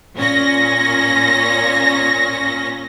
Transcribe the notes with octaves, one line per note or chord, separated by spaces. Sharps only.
A#2 C#4 A#6